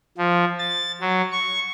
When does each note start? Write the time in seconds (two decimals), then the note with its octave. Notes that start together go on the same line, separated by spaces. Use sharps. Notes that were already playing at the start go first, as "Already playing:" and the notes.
0.18 F3
0.59 A6
1.01 F#3
1.32 C#6